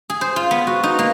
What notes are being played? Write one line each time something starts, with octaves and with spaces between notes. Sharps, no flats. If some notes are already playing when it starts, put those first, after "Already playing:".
G#4
C5
F4
B3
F#4
D#4
A#3